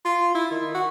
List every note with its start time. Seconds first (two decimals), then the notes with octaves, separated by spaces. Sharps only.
0.05 F4
0.35 E4
0.51 D#3
0.74 F#4